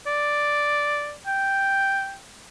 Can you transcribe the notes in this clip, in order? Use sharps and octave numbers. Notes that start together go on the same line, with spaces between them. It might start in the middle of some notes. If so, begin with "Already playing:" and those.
D5
G5